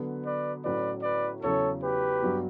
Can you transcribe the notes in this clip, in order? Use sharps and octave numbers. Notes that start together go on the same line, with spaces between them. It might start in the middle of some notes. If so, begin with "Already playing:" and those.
Already playing: D3 F#3 B3
B4 D5
A2 F#3 C#4 F#4 B4 D5
B4 D5
E2 C#3 F#3 C#4 A4 C#5
G4 B4
G2 F#3 B3 F#4